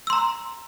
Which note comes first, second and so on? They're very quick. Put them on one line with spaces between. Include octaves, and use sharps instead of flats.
E6 C6 A#5